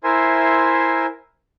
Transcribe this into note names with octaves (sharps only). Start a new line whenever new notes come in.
E4 A#4 C5 E5 G#5 C6